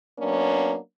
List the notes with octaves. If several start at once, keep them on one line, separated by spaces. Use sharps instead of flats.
F#3 A#3 B3 C#4 D4